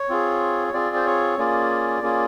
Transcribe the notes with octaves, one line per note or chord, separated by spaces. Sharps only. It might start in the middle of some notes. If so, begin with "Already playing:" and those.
Already playing: C#5
C4 F4 G#4
C#5
C4 F4 G#4 D5
C5
C#5
A#3 C#4 F4 G#4 D5
A#3 C#4 F4 G#4